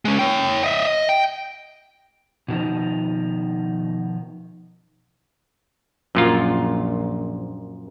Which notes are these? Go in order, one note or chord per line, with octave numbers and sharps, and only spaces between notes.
G#3 C#4
C#5 G5
D#5 E5
D#5
G5
B2 D#3 F3 D#4
A#1 F#2 A#2 F4